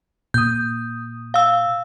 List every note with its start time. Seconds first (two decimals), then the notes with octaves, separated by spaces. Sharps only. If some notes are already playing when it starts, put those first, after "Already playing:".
0.34 A#2 D#6 G6
1.34 F5 E6